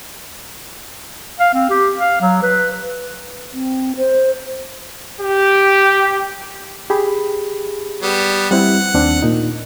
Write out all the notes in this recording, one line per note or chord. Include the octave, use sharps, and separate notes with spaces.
F5
C4
G4
F5
F#3
B4
C4
C5
G4
G4 G#4 B5
G3 B3
G3 C4 E4 F#5
D#2 C4 D4
A#2 D#4